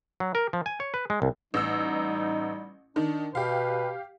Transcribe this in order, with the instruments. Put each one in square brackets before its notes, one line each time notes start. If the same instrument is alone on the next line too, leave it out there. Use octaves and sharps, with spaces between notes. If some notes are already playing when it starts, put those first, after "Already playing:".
[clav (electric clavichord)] F#3
A#4
F3
G#5
C#5
B4
G#3
C2
[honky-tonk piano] A1 E6 [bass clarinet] G3 [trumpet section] D#4
[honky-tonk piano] D#3 [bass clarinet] D4
[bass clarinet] B2 [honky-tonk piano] G4 F5 [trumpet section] B4